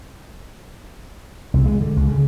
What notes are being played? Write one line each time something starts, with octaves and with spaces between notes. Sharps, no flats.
C2
G#3
D3
C#2
C#3